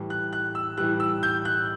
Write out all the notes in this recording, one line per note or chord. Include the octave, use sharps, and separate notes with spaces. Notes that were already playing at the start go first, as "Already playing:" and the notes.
Already playing: A2 E3 G3
F#6
F#6
E6
A2 E3 G3 F#6
E6
G6
F#6